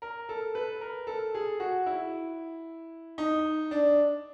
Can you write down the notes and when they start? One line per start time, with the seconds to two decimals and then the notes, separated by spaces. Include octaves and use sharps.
0.02 A#4
0.29 A4
0.55 B4
0.81 A#4
1.07 A4
1.34 G#4
1.60 F#4
1.86 E4
3.18 D#4
3.71 D4